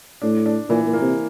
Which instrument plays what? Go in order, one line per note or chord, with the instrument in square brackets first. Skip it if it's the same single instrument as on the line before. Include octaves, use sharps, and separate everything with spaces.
[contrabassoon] A2 [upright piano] D4
[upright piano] D4
[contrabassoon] A#2 [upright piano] E3
[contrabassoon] A#2
[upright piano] A#3
[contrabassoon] C3